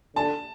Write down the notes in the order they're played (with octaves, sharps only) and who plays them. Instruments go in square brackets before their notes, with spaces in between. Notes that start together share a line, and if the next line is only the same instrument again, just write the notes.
[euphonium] D3 [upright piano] A5